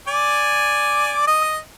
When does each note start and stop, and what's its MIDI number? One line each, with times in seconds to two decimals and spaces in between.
0.08 1.25 74
0.08 1.25 80
0.08 1.25 86
1.27 1.58 75
1.27 1.58 87